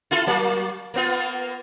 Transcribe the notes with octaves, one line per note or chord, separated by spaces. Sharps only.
E4 F4 A4
F#3 A#3
A#3 B3 F4